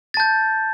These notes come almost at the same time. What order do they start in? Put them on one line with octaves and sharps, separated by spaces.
A6 A5 G6